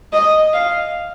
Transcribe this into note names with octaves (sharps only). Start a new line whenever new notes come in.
D#5
F5